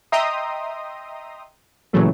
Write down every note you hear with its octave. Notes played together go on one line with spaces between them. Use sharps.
D#5 E5 G5 A#5 C6 D#6
A#2 C#3 E3 F#3 A3